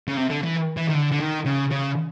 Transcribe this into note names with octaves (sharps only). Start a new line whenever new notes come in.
C#3
C3
D3
E3
E3
D#3
D3
D3
D#3
C#3
C#3